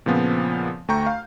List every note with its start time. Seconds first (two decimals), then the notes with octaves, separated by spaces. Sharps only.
0.06 A#2 C#3 F3 B3 C4
0.88 D2 A3 G5 A#5 C#6 G6
1.07 F5